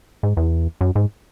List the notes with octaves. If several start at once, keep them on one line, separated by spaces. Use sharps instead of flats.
G#2
E2
F#2
G#2